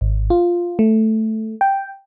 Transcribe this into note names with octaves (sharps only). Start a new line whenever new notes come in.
G#1
F4
A3
G5